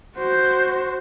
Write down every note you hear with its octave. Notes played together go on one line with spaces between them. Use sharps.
F#4 C5